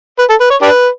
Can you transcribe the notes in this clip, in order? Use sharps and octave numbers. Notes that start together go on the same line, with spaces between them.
B4
A4
B4
C#5
D4 G4 B4